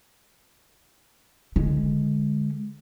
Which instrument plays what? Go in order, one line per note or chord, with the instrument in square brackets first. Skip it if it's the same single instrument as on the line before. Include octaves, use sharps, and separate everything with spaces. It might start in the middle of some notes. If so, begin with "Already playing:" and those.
[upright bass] D3 G#3